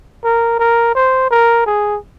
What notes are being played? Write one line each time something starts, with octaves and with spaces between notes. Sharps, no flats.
A#4
A#4
C5
A#4
G#4